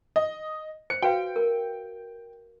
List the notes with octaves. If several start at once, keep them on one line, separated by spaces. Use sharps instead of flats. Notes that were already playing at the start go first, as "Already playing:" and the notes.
D#5
C5 C#7
F#4 B4 F5 G5
A#4